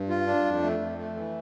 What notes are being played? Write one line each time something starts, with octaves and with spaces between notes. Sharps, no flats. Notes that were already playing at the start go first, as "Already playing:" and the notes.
Already playing: G2
F4
D4
F2
A3
F2
A3
E3